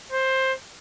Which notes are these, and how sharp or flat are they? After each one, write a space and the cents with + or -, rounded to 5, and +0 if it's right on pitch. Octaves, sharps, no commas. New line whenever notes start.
C5 +15